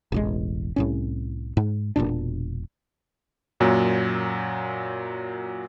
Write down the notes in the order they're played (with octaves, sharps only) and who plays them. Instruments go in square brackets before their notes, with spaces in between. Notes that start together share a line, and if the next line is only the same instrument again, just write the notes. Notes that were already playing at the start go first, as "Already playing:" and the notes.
[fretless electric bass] E1 A1 G#3
C2 A2 C#4
G#2
E1 C2 A#2 D4
[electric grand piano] F#2 A#2 F#3